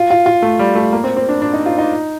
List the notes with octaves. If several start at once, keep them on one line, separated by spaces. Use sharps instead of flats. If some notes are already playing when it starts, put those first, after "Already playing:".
Already playing: F4
F4
F4
A3
G3
A3
A#3
C4
C4
D4
D4
D#4
F4
D#4